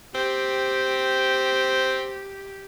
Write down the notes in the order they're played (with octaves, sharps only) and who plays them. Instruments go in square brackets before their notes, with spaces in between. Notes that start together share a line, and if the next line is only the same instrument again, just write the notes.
[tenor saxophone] C4 [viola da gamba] G4